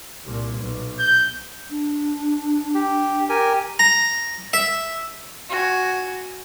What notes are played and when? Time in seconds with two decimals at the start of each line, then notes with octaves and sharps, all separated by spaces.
0.24 C2 A#2
0.58 B1
0.99 G6
1.70 D4
2.75 G4
3.29 G4 A#4 G#5
3.79 A#5
4.53 E5
5.50 F#4 G#5